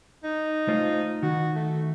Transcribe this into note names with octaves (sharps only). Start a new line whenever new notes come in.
D#4
A3 F4 C5
D#3 F#4
A3